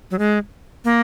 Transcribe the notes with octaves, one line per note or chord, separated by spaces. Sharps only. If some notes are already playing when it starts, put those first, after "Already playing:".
F#3
G#3
A#3